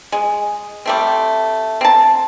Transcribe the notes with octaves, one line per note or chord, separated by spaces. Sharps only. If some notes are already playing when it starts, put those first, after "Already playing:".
G#3
G3 A3 C4
C4 A5